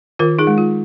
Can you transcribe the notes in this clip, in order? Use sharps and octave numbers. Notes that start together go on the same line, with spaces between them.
D#3 F4 A#4
D#4 G#4
G#3
F4